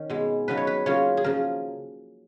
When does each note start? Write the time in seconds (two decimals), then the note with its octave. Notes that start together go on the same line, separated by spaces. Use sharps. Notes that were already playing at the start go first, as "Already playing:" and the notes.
Already playing: D#3 C#4
0.10 B2 G#3 B3
0.48 C#3 F#3 B3 D#4 B4
0.57 C#5
0.67 B4
0.86 C#3 F#3 A#3 C#4 F4 C#5
1.17 G#4
1.24 C#3 F3 A#4